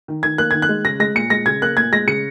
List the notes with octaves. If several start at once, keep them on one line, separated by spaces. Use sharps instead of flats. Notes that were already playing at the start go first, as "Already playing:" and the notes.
D#3
D#3 G#6
A#3 F#6
D#3 G#6
F#6
G#3
C#3 A#6
G#3 A#6
A#2 C#7
G#3 A#6
C#3 G#6
A#3 F#6
A#2 G#6
G#3 A#6
C#3 C#7